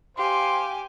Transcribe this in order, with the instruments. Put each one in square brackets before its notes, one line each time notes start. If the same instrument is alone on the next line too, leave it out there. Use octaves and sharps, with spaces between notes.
[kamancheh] G4 G#5 [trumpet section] C5 F5 C6